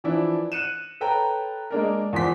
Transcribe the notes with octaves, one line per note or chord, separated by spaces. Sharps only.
E3 F3 D4 E4
F#6 C#7 D#7 E7
A4 B4 C#5 G5 A#5
G#3 A#3 D4 A#4
E2 F3 C6 B6